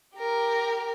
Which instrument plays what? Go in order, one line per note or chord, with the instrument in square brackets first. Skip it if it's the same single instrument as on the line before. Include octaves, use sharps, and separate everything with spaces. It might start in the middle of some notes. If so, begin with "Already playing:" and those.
[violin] G4 A#4